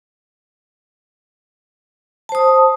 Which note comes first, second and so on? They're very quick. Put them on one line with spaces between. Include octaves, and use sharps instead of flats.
A5 C5 D#6